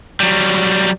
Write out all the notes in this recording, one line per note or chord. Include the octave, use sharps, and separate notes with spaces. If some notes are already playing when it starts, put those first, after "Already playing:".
F#3 G3